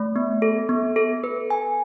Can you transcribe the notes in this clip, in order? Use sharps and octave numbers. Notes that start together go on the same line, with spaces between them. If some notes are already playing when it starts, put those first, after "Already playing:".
Already playing: A3
B3
A4
B3
A4
B4
G#5